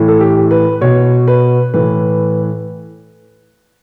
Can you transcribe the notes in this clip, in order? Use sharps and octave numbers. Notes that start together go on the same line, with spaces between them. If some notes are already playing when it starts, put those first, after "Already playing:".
Already playing: A2 E3
A4
G4
B4
B2 C#5
B4
A2 E3 B4